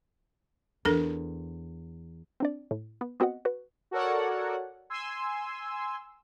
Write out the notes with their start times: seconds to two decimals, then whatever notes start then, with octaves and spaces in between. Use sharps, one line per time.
0.85 E2 D4 A4 A#4
2.40 C4 D4 D5
2.71 A2
3.01 B3
3.20 B3 C4 F#4 D#5 F#5
3.45 F#4 B4
3.91 F#4 A4 A#4 C#5 D5 F#5
4.90 G#5 C6 E6